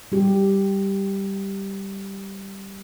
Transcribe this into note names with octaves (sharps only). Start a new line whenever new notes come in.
G3 G4